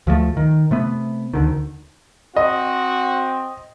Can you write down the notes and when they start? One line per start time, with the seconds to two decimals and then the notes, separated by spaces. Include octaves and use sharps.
0.07 D2 F3 G3 A3
0.37 D#3
0.71 C3 A3 B3
1.34 D2 D3 D#3
2.36 C4 F#4 D#5